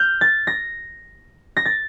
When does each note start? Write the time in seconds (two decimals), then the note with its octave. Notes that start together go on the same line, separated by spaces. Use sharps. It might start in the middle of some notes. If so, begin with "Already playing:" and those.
Already playing: F6 G6
0.21 A6
0.47 A#6
1.57 A#6
1.65 A6